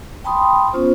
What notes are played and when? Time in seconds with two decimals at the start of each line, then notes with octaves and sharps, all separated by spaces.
0.24 G5 A5 B5 C6 D#6
0.73 B3 C#4 F4 C5